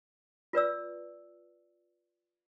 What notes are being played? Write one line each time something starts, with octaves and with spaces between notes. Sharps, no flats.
F4 B4 D5 E6